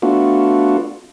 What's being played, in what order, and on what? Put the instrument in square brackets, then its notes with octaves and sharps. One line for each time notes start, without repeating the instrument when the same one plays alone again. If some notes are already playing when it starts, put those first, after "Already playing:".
[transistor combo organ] A3 B3 D4 F4 F#4